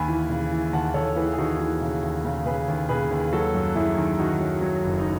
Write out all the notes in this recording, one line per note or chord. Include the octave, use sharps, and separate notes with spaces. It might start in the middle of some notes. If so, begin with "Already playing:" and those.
Already playing: D#2 G#5 B5
E3
C#3
E3
D#2 F#5 A5
D#2 A4 C#5
E3 G#4 B4
G#4
D#2 D#4 F#4
E3
C#3
D#2
C#3
C#3 G#4 B4
D#2
C#3 G#4 B4
D#2
F#3 F#4 A4
F#2
F#2 E4 G#4
D#3
D#3 D#4 F#4
F#3
F#3
F#1
D#4